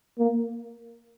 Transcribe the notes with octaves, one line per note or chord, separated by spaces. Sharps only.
A#3